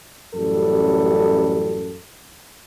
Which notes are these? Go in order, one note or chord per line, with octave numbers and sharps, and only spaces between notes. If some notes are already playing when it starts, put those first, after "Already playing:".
A1 F#2 G3 A4